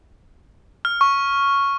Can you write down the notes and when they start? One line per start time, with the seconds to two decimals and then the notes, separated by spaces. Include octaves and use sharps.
0.85 F6
1.01 C#6